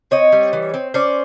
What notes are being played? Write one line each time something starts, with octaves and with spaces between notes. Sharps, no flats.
C4 C#5 D#5
G3
E3
C4
C#4 C5 D5